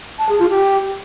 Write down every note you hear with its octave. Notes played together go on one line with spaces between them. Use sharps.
A5
G#4
F4
G4